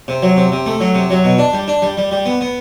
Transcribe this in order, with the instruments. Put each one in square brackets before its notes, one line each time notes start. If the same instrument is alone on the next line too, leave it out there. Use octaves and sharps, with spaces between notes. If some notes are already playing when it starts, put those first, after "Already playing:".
[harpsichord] C3
F#3
C3
C3
A3
F#3
C3
F#3
B2
D4
G3
D4
G3
G3
G3
B3
B3